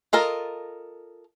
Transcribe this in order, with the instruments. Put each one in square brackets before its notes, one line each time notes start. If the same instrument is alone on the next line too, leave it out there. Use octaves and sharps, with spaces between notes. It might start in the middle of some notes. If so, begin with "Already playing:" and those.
[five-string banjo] F4 A4 A#4 D#5